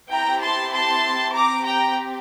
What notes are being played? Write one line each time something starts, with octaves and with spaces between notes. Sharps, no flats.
C4 E4 G4 G5 A#5
A5 C6
A5 C6
C4 G4 A#5 D6
G5 A#5